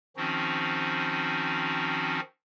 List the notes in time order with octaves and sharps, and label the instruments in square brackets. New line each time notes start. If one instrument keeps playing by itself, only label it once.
[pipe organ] D#3 F3 C4 C#4 D#4 F#4